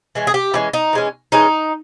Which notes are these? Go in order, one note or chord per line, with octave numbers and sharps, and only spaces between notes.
E3 G#3 C#4
G#4
G4
E3 G#3 C#4 E4
D#4
E3 G#3 C#4
E3 G#3 C#4 D#4